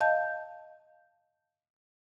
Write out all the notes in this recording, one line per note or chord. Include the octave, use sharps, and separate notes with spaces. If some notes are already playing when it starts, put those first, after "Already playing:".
D#5 F5 A5 G6